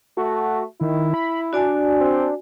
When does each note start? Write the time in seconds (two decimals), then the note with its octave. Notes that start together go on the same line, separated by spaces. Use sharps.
0.17 A3 F#4
0.81 D#3 E4
1.14 B5
1.53 D4 F#4 D5 G#5
2.00 C4